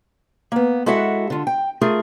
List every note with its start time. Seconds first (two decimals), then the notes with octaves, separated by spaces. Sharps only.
0.52 A#3 B3
0.86 G#3 E4 F#4 A4 E5 F#5
1.30 D3 F4
1.47 G5
1.81 A3 F4 G#4 A#4